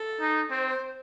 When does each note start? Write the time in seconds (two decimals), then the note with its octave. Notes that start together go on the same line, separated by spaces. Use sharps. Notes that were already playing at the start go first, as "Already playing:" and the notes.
Already playing: A4
0.20 D#4
0.51 C4 C5